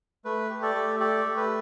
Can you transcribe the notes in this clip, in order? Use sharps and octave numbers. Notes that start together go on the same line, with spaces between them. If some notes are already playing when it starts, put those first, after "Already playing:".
A3 B4
G4
A4 D5
A3
G4 A4 D5
A3
B4